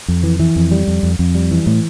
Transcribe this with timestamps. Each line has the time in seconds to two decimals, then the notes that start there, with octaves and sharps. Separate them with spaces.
0.08 F2
0.23 E3
0.40 E3
0.56 F2
0.71 G3
0.88 F2
1.03 F2
1.19 F2
1.35 G3
1.51 E3
1.67 A2